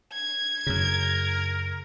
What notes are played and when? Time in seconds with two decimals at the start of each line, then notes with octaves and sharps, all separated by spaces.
0.13 G#6
0.67 F#2 C#3 A#4